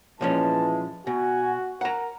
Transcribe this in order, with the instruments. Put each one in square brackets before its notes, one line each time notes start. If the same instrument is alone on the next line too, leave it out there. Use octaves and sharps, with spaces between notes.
[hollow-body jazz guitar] A#2 F3 C#4 [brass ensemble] E3 G#3 [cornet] A5
[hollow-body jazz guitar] B2 [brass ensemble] F#4 [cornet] G#5
[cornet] A#4 [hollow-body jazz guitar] F#5 A#5